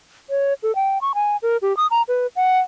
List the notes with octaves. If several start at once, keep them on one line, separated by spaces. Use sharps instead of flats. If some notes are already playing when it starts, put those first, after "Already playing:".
C#5
A4
G5
C#6
G#5
A#4
G4
D#6
A#5
B4
F#5